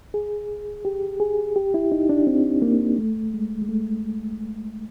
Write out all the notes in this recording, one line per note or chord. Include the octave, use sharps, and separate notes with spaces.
G#4
G4
G#4
G4
E4
D#4
D4
C4
A#3
A3
G#3
G#3
A3